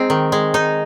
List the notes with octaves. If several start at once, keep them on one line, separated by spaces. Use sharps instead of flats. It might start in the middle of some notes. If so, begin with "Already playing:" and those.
Already playing: G#3 C4 D#4
D#3
G#3
D#4